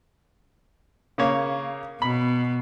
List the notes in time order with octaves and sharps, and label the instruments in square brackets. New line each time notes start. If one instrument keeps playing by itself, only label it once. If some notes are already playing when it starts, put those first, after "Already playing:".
[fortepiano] C#3 A#3 C#5
[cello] B2 [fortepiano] B5